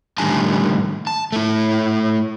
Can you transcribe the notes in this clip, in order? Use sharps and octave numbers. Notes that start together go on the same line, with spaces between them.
A2 D3 D#3 G3 G#5 A5
A5
A3 E4